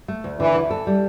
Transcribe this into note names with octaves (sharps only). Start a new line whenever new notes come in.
A3
D2
D3 E3
D2
A4
G3